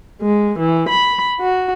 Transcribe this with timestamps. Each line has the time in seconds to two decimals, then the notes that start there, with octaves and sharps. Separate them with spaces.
0.21 G#3
0.58 E3
0.88 B5
1.40 F#4